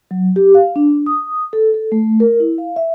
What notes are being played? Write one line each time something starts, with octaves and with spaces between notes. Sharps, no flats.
F#3
G4
F5
D4
D#6
A4
A4
A3
A#4
E4
F5
E5